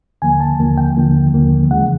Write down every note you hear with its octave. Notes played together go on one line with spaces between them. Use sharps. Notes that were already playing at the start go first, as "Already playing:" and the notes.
D#2 D3 F3 A#3 G#5
A5
D#2 D3 F3 A#3
G5
D#2 D3 F3 A#3
D#2 D3 F3 A#3
E2 C#3 F3 G#3 F#5